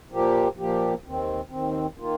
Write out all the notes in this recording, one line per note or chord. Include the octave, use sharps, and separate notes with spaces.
A#2 F3 A#3 G4
A#2 F3 A#3 G4
D#2 D#3 C4
D#2 D#3 C4
D#3 A#3 F4